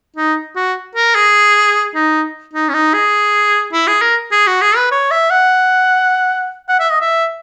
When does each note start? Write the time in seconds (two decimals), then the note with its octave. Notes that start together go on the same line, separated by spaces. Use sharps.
0.16 D#4
0.56 F#4
0.95 A#4
1.15 G#4
1.95 D#4
2.53 D#4
2.69 C#4
2.74 D#4
2.94 G#4
3.72 E4
3.88 G#4
4.02 A#4
4.31 G#4
4.47 F#4
4.61 G#4
4.76 B4
4.92 C#5
5.11 E5
5.30 F#5
6.69 F#5
6.80 E5
6.90 D#5
7.01 E5